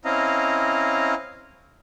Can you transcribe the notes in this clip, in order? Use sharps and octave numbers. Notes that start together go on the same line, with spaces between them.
C4 C#4 E4 D#5 F5 A#5